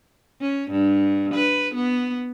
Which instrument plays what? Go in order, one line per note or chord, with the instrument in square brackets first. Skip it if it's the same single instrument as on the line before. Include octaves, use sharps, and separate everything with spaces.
[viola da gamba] C#4
G2
B4
B3